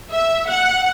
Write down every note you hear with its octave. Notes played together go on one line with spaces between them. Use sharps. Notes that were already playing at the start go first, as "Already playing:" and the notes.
E5
F#5